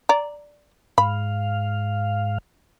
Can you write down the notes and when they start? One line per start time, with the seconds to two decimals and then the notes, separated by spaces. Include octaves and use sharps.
0.09 D5 A#5
0.98 G#2 F5 B5